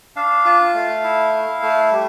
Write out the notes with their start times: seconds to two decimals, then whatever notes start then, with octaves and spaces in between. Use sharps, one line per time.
0.16 D4 F5
0.45 F4
0.74 A3
1.04 E4
1.33 E4
1.62 A3
1.92 G3